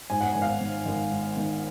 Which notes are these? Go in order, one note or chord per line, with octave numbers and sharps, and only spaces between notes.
G#2 G#5
F#5
G#1 G#5
F5
F#5
D#3
G#1
G#2
D#3